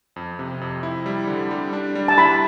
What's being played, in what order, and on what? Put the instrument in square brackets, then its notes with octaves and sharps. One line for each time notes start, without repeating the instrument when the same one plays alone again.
[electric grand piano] F2
C3
F2
E4
G3
D3
G3
D4
G3
[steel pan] A5
[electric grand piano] E4 [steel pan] B5